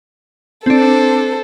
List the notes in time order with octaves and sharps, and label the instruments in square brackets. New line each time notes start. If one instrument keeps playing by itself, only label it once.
[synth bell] C4 D4 [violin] A4 C5